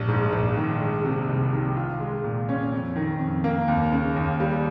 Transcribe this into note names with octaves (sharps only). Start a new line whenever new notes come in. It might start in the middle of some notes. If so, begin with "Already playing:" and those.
Already playing: A#1 G3
G#2
A#1
D#3
G#3
C3
C2
D#3
F4
G#3
A#2
C#4
F2
D#3
F2
A#3
D#2
C#3
D#2
G3